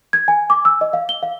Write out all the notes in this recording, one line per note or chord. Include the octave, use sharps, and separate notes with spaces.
G#6
G#5
D6
E6
D#5
F5
G7
F5